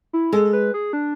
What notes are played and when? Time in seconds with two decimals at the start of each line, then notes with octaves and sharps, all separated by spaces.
0.13 E4
0.33 G#3 A4
0.53 B4
0.74 G#4
0.93 D4